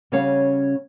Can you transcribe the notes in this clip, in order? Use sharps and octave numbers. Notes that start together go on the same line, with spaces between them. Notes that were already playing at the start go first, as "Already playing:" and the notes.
C#3 G3 C#4 C#5 F5 F#5